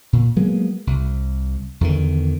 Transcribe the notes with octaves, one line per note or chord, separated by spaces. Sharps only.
A#2
F#3 G#3 A#3 B3
C2
E2 D3 D#3